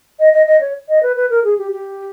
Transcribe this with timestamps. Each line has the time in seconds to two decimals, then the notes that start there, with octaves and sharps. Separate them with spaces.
0.20 D#5
0.33 D#5
0.47 D#5
0.61 C#5
0.89 D#5
1.03 B4
1.16 B4
1.30 A#4
1.44 G#4
1.58 G4
1.72 G4